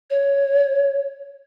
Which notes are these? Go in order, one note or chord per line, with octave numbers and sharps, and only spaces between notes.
C#5